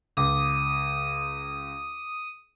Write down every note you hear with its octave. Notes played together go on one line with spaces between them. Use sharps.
C#2 D6 D#6